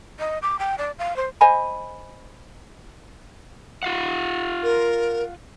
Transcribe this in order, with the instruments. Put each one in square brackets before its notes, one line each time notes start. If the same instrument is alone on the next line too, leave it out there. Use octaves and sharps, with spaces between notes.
[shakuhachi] D#5
D6
G5
D5
F5
C5
[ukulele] C5 D#5 G#5 B5
[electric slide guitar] F4 F5 F#5
[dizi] A#4